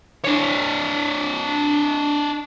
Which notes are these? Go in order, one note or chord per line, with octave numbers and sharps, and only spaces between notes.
D4 C#5